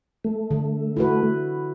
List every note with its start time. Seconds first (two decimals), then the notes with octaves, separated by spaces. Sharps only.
0.24 A3
0.51 D3
0.97 E4 F#4 B4